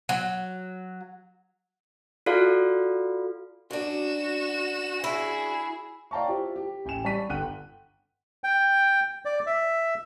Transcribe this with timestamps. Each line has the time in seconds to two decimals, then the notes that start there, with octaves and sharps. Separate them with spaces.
0.09 F#3
2.26 F4 F#4 A4 D5 F5
3.71 F#2 D4 F#4 E7
5.04 E4 G#4
6.11 D5 F5 G5 A5 A#5 C#6
6.27 E4 F4 G4 C5
6.56 G4
6.85 A1 G5 G#5 E7
7.04 G3 D5 A5 C#6 B6 D#7
7.29 G1 F#5 G5 F#6 D#7
8.44 G5
9.25 D5
9.47 E5